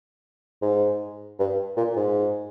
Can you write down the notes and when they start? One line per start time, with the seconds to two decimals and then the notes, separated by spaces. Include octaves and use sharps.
0.62 G#2
1.39 G2
1.77 A#2
1.96 G#2